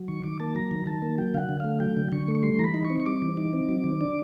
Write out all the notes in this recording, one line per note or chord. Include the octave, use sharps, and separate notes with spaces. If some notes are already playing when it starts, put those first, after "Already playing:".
Already playing: F#3
D#3 C#6
D#3 D6
A#3 A5
F#3 A#5
D#3
D#3 A5
A#3
F#3 G5
D3 F5 F#5
D3
A3 F5
F#3 G5
D3
D3 C#6
A3
C#6
G3 C6
E3 A#5 B5
D#4
C#6
C4
C#6
G3 D6
E3
D#4
C4
F#3
D#3
D4